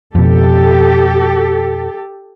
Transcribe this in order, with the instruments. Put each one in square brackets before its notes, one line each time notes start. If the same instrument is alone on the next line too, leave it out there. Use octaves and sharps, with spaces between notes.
[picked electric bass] F2 B2 [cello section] G4 A4